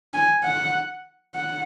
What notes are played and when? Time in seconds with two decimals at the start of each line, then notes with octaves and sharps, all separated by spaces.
0.14 G#5
0.44 F#5
1.35 F#5